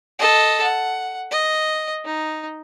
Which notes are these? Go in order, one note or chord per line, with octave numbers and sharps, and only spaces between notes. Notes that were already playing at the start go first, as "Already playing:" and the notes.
A4 D#5
F#5
D#5
D#4